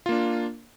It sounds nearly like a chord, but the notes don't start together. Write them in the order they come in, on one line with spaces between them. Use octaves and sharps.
F4 A#3 D4